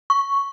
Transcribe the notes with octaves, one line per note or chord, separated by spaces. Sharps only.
C#6